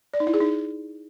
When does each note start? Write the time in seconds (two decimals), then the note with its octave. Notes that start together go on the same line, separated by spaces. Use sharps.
0.14 D5
0.20 D#4
0.27 E4
0.34 G#4
0.40 D#4